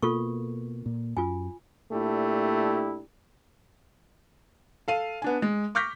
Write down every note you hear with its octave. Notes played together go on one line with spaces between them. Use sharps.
B2 A#3 F4 A4 C#6
A#2
F#2 F4 G#5
A#2 A3 D4 E4 G4
A4 F5 D#7
B3 D4 G#5
G#3
C#6 D6 F6 G6 A#6 B6